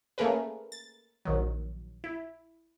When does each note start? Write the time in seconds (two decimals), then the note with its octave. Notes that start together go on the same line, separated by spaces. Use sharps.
0.18 A3 A#3 C#4 G#4 A#4 B4
0.72 A6
1.25 A#1 D#3 F#3
2.04 E4